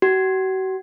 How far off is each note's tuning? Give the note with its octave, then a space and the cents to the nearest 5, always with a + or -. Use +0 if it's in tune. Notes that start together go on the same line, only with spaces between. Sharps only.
F#4 +40